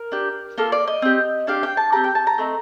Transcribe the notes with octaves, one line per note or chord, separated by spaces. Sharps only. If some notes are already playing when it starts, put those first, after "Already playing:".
Already playing: A#4
D4 G4
A#3 F4 A4
D5
D#5
C4 G4
D4 G4 F5
G5
A5
C4 G4 A#5
G5
A5
A#5
A3 C4 D#4